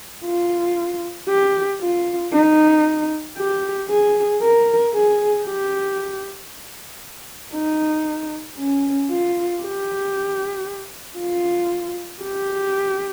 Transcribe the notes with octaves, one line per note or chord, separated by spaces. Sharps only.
F4
G4
F4
D#4
G4
G#4
A#4
G#4
G4
D#4
C#4
F4
G4
F4
G4